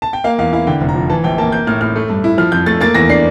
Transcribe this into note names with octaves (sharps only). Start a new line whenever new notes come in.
A5
G5
A#3 F5
E2 F5
E4 F5
D3 G5
F1
A#5
F3
E3 A5
A#1 G5
A#3 A5
A#3 G6
A2 F6
A2 F6
A3
G2
E4
F3 F6
F2 G6
A3 A6
A#3 A6
E2 A#6
D4 C7